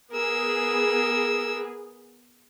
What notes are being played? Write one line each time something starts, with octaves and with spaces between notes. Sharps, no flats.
B3 G#4 A#4 E6